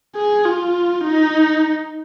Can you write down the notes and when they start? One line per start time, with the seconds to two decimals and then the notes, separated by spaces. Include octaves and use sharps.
0.16 G#4
0.45 F4
1.05 D#4